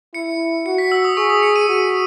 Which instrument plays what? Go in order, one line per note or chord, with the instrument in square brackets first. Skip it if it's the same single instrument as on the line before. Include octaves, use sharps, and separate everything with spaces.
[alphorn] E4 [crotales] C#7
[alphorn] F#4 [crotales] C#7
[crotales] B6
E6
D#6
[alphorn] G#4 [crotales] C#6
[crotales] D#6
C#7
D#7
[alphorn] F#4